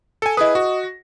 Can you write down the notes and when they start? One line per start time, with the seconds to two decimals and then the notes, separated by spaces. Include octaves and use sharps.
0.22 A4 G#5 C#7
0.37 E4 G#4 B4 D#5 D#6
0.55 F#4
0.83 A#6